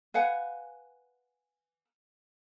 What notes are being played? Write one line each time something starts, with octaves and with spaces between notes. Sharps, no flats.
B4 F5 F#5 G#5